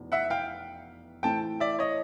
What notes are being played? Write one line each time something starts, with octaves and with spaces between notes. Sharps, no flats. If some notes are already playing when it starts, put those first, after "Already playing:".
Already playing: F1 E2 B2
E5 F#5
F5 G5
A2 E3 A3 C4 G5 A5
D5 E5
C#5 D#5